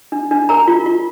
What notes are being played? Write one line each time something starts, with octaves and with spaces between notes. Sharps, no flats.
D4
D4
A#4 A#5
F4
F4